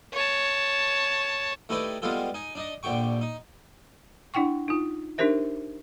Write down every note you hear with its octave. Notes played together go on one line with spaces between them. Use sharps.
C#5 A5
A3 D#4 E4 G4 B4 D5
G3 G#3 B3 F4 G4 A4
D#4 G#5
D4 D#4 D#5
A#1 D3 G4 G5 C#6
D#4
D4 E4 F#5 G5 C#6
D#4 F4
D4 D#4 G4 A#4 C5 E5